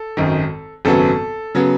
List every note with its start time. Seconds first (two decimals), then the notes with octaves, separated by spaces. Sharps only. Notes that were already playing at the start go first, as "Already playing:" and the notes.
Already playing: A4
0.17 G#1 F#2 D#3
0.85 G#1 F#2 C#3 F#3 B3 A4
1.55 C#3 F#3 B3